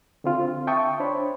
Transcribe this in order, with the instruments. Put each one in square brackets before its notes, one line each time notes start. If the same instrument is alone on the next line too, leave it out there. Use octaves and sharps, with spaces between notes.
[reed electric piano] D3 C4 F4
E5 G5 A5 C#6 D#6
D4 C5 C#5 B5